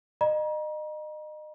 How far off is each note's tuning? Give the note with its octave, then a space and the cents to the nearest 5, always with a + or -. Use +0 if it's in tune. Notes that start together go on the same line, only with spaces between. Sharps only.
D#5 -30 A#5 +35